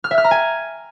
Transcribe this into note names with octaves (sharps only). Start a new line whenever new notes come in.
F6
E5
F6
A#5
G#5